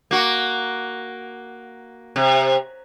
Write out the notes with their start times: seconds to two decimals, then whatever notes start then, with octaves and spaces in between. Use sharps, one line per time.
0.11 A#3 F#4
2.16 C3